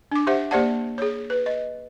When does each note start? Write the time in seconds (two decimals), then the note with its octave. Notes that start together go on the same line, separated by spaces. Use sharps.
0.12 D4 D6
0.27 G4 C5 E5 F#5
0.51 A#3 G4 C5 D5 F#5 A5
0.98 G#4 C#5
1.30 B4
1.46 D#5